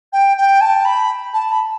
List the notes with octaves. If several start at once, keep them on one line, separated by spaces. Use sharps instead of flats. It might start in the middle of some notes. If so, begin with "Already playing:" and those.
G5
G5
A5
B5
A5
B5